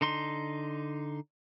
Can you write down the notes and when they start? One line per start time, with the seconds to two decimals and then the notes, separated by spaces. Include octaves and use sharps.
0.01 D3 D#4 C6